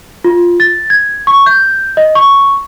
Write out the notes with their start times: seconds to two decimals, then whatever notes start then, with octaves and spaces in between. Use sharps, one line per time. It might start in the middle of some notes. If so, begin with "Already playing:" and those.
0.24 F4
0.60 A6
0.90 G#6
1.27 C#6
1.46 G6
1.97 D#5
2.15 C#6